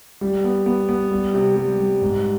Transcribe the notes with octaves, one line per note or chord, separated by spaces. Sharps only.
G3
B3
B3
B3
G3
C3
G3
G3
G#2